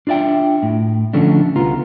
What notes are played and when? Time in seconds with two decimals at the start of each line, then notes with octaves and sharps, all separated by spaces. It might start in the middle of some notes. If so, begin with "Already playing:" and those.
0.07 D4 F4 D5 E5 G5
0.63 A2
1.13 D3 F3 A3 C#4 D4
1.56 C2 B3 F4 A#5